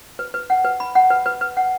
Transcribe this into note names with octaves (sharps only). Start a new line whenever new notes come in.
B4
B4
F#5
B4
B5
F#5
B4
B4
B4
F#5